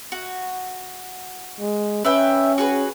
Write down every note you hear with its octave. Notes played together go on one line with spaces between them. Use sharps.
F#4
G#3
C#4 B4 E5 G5
F#4 G#4 B4